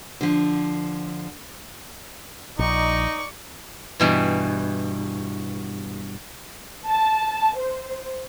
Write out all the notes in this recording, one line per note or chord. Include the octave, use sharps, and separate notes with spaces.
D3 F3
A#1 D#4 D5 C#6
G2 B2 E3
A5
C5